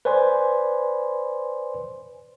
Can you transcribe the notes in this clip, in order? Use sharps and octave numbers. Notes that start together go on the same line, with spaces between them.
B4 C5 D5 G#5 B5 C6